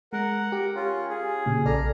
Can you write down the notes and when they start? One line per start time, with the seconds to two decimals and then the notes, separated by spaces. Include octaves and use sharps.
0.13 G#3 A#4 F#5
0.52 G4
0.75 C#4 F4
1.09 G#4
1.46 A#2 C#3
1.66 A#1 A4 D5 A#5 F6